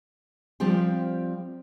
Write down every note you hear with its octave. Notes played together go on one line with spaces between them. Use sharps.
F3 G3 C4 F4 G4